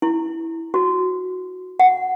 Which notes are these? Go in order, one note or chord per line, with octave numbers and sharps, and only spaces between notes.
E4
F#4
F#5